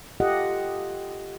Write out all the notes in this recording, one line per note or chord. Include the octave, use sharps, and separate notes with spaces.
F4 G4 A4 D#5 F#5